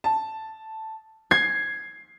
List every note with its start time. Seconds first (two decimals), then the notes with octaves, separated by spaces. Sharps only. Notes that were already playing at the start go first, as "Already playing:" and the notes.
0.04 A5
1.31 G#6 C7